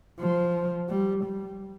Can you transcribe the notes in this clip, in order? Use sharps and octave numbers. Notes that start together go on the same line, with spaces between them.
F3
G3
G3